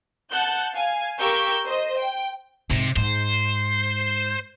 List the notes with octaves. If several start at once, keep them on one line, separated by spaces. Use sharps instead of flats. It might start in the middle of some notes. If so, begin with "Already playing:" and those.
F#5 A5 F#6 G6
F5 G#5
G4 A#4 F5 C#6 E6 G6
C5 D#5
G5
G#2 C3
G#2 C5